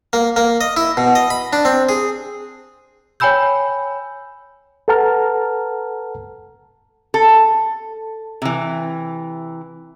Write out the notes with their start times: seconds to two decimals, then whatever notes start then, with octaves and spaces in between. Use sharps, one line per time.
0.13 A#3
0.36 A#3
0.61 D#5
0.77 E4
0.97 B2
1.15 D#5
1.30 B5
1.53 D4
1.65 C4
1.89 G#4
3.20 C#5 G5 G#5 B5 E6 G6
4.88 A4 B4 F#5 A5 A#5 F6
7.14 A4
8.42 C3 E3